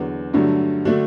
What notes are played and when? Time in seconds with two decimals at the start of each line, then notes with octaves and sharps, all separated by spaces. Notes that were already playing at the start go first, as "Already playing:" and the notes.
Already playing: E2 D3 F#3 B3 F#4
0.34 G2 D3 F#3 A3
0.85 D3 A3 D4 F#4